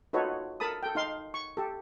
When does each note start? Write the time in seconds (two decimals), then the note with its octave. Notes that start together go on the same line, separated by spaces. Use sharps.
0.13 D#4 F4 F#4 A4 B4 C#5
0.60 A4 A#4 A5 B5 D#6
0.83 A4 G5
0.95 D#4 F5 C6
1.34 C#6
1.57 G4 A4